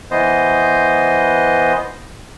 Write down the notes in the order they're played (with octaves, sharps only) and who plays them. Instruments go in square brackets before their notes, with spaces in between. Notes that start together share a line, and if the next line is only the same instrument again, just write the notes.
[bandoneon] E3 B3 C5 D#5